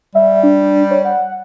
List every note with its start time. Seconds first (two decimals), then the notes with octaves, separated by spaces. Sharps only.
0.15 G3 E5
0.43 D4
0.91 C#5
1.05 F#5